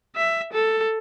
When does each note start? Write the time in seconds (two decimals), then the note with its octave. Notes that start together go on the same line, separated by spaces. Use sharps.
0.16 E5
0.53 A4